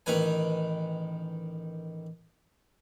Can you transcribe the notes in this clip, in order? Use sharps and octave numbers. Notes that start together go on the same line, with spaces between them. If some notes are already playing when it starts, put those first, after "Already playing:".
A1 D#3 B4 G#5